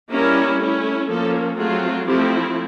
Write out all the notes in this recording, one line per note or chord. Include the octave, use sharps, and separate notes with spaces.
G3 A#3 C#4 E4 A#4
A3 C#4 E4
F3 A#3 C#4 A4
F#3 A3 C4 F4 G#4
F3 A3 C4 E4 G4